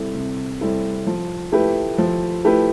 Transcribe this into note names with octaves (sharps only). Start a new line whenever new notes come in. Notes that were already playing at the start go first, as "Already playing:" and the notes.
Already playing: C3 G3 C4 E4 A4
C3
G3 C4 E4 A4
F3
A3 E4 G4 B4
F3
A3 E4 G4 B4